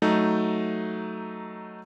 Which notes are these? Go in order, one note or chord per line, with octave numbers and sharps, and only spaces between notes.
F#3 A3 D#4